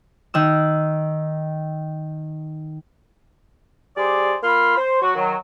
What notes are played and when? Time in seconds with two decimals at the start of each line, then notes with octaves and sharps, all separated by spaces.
0.34 D#3 E6
3.96 G3 G#4 C5 D5
4.43 A#3 F4 B5 C6 F6
4.77 C5
5.01 F#3 F#4
5.15 D#3 F#3